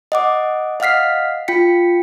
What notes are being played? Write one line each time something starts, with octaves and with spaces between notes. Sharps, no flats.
D#5 F#5 D6
D#5 F5 F#5 F6 B6 C7
F4 G5 B6 C#7